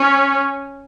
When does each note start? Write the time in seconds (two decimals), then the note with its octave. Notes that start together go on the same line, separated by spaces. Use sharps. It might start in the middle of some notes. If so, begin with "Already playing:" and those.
Already playing: C#4